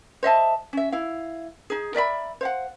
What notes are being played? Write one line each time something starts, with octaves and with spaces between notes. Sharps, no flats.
C5 D#5 E5 A5
C#4 E5
E4 F5
D#4 G#4
A#4 D5 E5 B5
C5 F5 F#5